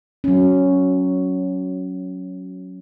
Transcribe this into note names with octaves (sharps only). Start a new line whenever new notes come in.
F#3 C#4